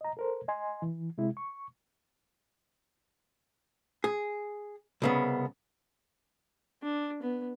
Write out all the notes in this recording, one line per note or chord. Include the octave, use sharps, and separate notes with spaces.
D#5 A#5
A4 A#4 C5
D#5 G#5 C6
E3
C3 G#3 E4
C#6
G#4
C2 C#3 B3
D4
B3